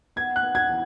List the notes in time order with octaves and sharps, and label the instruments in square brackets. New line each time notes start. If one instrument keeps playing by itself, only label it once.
[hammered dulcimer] B3 [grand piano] G#6
[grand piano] F#6
[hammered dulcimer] B3
[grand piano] G#6
[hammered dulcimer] E3